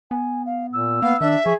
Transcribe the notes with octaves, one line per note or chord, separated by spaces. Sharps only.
B3 G#5
F5
A#2 E6
A#3 B3 F5
D#3 D4 E5
F3 G#4 C#6